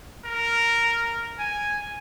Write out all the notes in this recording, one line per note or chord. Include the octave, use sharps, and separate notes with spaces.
A#4
G#5